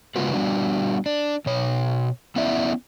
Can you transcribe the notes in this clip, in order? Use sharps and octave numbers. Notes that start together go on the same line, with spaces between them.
C#3 G#3 B3 F4 F#4 B4
G3 B3 D4 F#4
D4
B2 C#5
B3 C#4 E4 D5 E5